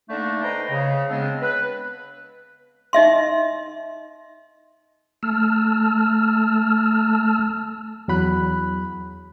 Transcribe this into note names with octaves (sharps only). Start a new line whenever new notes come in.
D3 A3 A#3 D4 D#4
B4 C5 D#5 G5 A#5
C#3
C#3 G#3 B3 C4 D4
B4
D#4 D#5 E5 C6
A3 A5 E6 F6
E2 F#3 B5 F#6